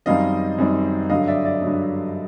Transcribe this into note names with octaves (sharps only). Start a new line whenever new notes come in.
F#2 D#3 G3 C4 D#5 F5
F#2 D#3 G3 C4
G2 D3 F#3 D#5 F5
D5 E5
D5 E5
G2 D3 F#3